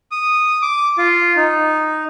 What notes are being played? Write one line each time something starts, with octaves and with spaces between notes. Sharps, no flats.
D#6
D6
F4
D#4